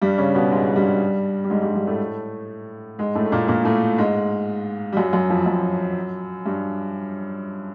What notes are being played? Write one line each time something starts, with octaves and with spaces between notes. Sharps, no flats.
G2 G3
C#3 C#4
B2 B3
G#2 G#3
G2 G3
G3
G#2 G#3
G2 G3
G2 G3
A2 A3
G#2 G#3
A2 A3
A3
A#2 A#3
A#2 A#3
A2 A3
G#2 G#3
G3
F#2 F#3
F#2 F#3
F2 F3
F#2 F#3
G2 G3